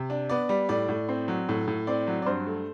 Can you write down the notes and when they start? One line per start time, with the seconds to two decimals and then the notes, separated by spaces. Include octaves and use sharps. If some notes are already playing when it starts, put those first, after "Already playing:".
Already playing: C3
0.10 D4
0.30 B3 D5
0.49 G3
0.69 A2 D5
0.89 A2
1.09 C4
1.28 F#3
1.49 A2
1.67 A2
1.87 C4 D5
2.07 F#3
2.22 D5
2.26 G2 C5
2.47 A3